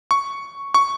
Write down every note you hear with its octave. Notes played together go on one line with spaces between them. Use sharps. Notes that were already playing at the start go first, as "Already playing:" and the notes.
C#6
C#6